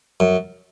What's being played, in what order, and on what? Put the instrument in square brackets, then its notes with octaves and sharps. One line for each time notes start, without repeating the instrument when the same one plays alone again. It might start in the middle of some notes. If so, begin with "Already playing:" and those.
[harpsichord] F#2